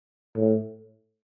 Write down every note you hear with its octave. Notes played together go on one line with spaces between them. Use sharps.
A2